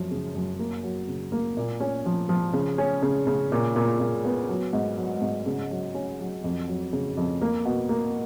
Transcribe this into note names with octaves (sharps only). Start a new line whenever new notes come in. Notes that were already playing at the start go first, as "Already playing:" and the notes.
Already playing: F#2 F3
C#3
F#2
A#3
F#3
C#3
A#3
A#2
C#4
F3
F3
C#3
C#4
C#3
C#3
A#2
A#2
A#2
B3
F#3
G#2
F#3
G#2
C#3
F#3
C#4
F#3
F2
F#3
C#3
F2
A#3
B2
A#3